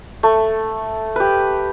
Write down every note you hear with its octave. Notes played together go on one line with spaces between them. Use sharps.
A3
G4 B4